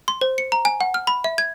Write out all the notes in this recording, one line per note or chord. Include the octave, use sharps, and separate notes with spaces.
C6
C5
C#7
A#5
G#5
F#5
F6
B5
E5
G#6